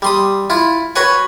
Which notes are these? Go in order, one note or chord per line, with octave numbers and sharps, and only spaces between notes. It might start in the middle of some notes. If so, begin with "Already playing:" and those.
G3 C6 D#6
E4 F4
F#4 B4 C#5 F#5 G#5